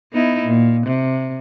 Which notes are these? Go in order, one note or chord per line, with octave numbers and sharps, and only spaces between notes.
B3 D#4 E4
A#2
C3